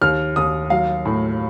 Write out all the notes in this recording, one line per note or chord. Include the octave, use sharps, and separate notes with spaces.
D#2 F6
D#2 D#6
F#3 F5
A2